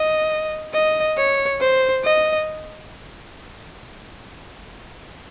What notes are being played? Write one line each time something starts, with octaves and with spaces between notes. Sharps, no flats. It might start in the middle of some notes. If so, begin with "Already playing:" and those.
Already playing: D#5
D#5
C#5
C5
D#5